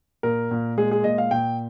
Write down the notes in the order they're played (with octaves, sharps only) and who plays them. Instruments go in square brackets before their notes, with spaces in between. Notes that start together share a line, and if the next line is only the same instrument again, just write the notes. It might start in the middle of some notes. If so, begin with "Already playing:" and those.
[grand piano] A#2 A#4
A#2
G#3 G#4
G#4
A#2 D#5
F5
A#2 G5